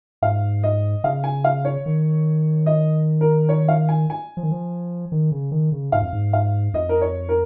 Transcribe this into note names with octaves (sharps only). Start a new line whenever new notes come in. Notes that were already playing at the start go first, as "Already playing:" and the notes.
G#2 F5
D#5
C#3 F5
G#5
F5
C#5
D#3
D#5
A#4
C#5
F5
G#5
G#5
F3
D#3
F3
D#3
C#3
D#3
C#3
G#2 F5
F2
G#2
F5
F2 D#5
A#4
C#5
A#4